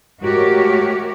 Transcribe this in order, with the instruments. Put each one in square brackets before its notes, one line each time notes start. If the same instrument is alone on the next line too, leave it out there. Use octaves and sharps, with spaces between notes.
[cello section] G#2 A3 F#4 G4 A#4 C#5